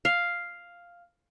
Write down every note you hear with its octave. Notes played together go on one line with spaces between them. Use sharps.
F5